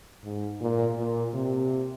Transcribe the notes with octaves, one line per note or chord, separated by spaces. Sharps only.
G#2
A#2
A#2
C3